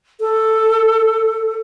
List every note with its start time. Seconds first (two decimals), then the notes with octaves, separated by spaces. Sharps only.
0.21 A4